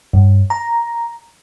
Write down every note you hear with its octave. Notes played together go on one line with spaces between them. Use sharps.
G2
A#5